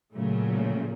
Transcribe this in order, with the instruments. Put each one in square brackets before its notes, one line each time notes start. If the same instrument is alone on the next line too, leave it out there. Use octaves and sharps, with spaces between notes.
[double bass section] A#2 [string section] C#3 F#3 A3